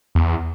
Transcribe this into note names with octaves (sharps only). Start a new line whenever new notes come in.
E2